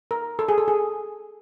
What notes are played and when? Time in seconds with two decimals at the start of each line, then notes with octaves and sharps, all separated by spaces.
0.11 A#4
0.39 A4
0.49 G#4
0.58 A4
0.68 G#4